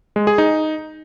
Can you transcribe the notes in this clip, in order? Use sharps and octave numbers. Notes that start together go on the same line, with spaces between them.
G#3
G#4
D#4